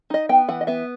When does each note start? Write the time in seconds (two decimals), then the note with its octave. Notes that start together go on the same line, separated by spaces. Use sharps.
0.10 D#4 D#5
0.29 B3 G5
0.49 E3 F#5
0.61 D#5
0.67 B3 E5